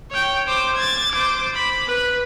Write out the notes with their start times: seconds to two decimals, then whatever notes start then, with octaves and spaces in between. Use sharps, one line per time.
0.10 C#5 G5
0.47 C5 D6
0.75 G#6 A6
1.11 C5 D6
1.55 B5
1.87 B4